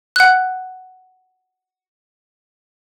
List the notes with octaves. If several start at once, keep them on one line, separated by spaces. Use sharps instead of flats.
F#5 F#6